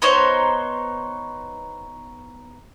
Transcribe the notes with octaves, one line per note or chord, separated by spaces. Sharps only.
B3 D#4 C5 C#5